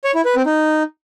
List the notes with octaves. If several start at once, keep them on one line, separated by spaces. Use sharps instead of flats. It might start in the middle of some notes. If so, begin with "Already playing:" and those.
C#5
E4
B4
C4
D#4